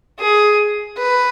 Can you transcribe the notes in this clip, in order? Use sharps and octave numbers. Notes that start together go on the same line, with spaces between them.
G#4
B4